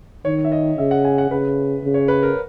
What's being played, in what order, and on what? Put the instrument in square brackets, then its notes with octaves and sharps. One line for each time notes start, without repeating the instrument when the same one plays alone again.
[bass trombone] D#3 [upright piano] C#5
[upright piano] E5
D#5
[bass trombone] C#3 [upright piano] E5
[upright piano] F#5
G#5
F#5
[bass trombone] C#3 [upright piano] B4
[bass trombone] C#3
[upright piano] C#5
B4
A#4